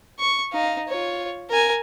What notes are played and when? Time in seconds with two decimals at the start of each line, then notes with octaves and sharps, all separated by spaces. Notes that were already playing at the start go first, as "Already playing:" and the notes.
0.19 C#6
0.52 D#4 F5
0.89 F4 C#5
1.49 A#4 G#5